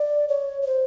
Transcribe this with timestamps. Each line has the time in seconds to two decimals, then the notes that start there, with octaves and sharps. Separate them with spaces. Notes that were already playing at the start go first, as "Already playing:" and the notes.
Already playing: D5
0.28 C#5
0.62 C#5
0.67 C5